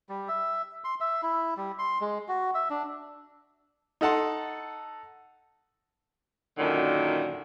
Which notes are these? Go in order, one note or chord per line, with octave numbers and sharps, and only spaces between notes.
G3
E5
C6
E5
E4
G3
C6
G#3
F#4
E5
D4
D#4 A4 F#5 A5 C6
F#2 A#2 D3 D#3